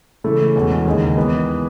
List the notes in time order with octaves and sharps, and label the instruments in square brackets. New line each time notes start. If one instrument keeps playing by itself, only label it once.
[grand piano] C#3 E3 A3 E4 A4
E2 B2 G#3 C#4 F#4
D#2 C#3 G#3 D#4
E3 G#3 B3